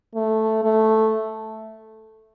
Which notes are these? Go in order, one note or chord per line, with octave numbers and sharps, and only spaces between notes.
A3
A3